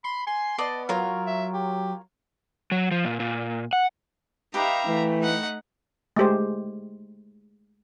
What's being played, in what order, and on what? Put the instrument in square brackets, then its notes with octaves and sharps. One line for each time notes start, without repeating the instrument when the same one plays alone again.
[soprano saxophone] B5 [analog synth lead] C6
[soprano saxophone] G#5 [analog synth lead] C6
[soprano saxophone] B3 [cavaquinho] D5 D#5 A5
[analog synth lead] F#3 [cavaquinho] F4 A#4 C#5
[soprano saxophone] E5
G4
[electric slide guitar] F#3
F3
A#2
A#2
F#5
[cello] D#4 F5 [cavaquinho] G4 B4 D6 [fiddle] E5 A#5
[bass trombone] E3 [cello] A3
[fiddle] D#4 F#5
[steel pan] G#3 A3 G4 C5